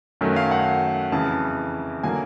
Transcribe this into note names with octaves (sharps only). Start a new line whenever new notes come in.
F#2 D#3 F#3 A3
F5
F#5
F2 C#3 E3 A5
D3 F#3 A#3 G#5